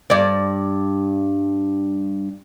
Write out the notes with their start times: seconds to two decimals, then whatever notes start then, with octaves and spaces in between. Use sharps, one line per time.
0.10 G2 D5